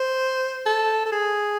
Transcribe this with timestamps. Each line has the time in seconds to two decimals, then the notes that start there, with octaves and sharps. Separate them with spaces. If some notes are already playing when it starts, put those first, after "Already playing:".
Already playing: C5
0.66 A4
1.06 A4
1.12 G#4